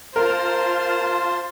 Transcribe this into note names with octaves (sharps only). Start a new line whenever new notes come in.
F4 A#4 C5 A5 C6 F6